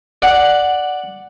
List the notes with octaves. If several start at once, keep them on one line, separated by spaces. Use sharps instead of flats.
D5 F#5